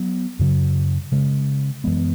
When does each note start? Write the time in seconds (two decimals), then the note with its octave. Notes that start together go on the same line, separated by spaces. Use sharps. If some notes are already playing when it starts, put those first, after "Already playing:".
Already playing: F#3 B3
0.39 F#2 C#3 F#3
1.12 C#3 G#3 C#4
1.84 F#2 E3 G#3 B3